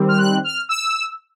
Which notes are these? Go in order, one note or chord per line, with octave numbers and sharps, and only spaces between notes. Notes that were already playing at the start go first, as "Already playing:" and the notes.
Already playing: D#3 G3 C4
F6
F#6
F6
E6